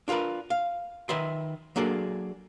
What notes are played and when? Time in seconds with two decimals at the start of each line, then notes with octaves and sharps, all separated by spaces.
0.08 D4 F4 G4 A#4 B4
0.50 F5
1.09 D#3 B4 E5 C6
1.76 F#3 A#3 D4 G#4 A4